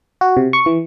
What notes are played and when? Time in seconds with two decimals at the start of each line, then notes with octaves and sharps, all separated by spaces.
0.21 F#4
0.37 C3
0.53 C#6
0.66 E3